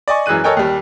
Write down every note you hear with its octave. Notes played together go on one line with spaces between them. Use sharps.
D5 D#5 G#5 C#6
F#2 E3 G#3 F#6 D#7
A4 A#4 C#5 D#5 G5 G#5
D#2 G3